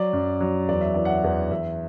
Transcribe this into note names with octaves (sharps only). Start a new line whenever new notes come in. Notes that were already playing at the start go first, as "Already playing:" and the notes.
Already playing: F#3 D5
F#2
F#3
E2 D5
E5
E3 D5
F#5
E5
E2
E2 E5